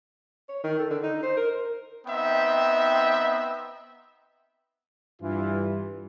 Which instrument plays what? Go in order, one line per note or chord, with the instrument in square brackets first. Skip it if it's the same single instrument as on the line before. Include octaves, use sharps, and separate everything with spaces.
[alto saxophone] C#5
D#3
A4
D3
D#4
C5
A#4
[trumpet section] B3 C4 D#4 D#5 E5 G5
[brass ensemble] G2 [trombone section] E3 F4